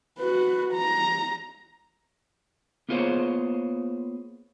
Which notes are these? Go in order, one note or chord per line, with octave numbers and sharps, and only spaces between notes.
F#4 B4
A#5
A#3 B3 F4 G#4 C5 C#5